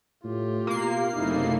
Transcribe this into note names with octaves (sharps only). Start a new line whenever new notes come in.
A2 F4 G4
B2 A#3 C7
F#1 F#2 C3 A3 D#4 E4